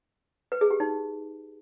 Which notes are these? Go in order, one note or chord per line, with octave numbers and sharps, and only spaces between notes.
B4
G#4
G4
D#4